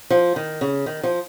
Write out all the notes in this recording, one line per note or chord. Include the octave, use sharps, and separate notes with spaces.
F3
D#3
C#3
D#3
F3